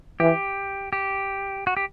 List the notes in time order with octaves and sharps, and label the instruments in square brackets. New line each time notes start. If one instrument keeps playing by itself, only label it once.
[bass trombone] E3 [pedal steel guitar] G4
[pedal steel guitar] G4
F#4
G4